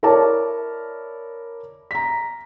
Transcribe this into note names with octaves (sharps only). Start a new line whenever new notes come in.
E4 A#4 C#5 D5 A5 D6
A#5 B6